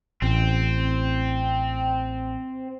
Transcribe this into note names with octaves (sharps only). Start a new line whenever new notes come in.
A1 C4